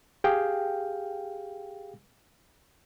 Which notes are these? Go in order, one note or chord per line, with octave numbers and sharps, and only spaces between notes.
G4 G#4 F5 G5